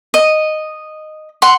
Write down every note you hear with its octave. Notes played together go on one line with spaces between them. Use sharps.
D#5
F#5 C6